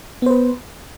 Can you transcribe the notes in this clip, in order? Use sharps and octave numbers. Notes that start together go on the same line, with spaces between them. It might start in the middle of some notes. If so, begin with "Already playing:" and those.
B3 B4 C5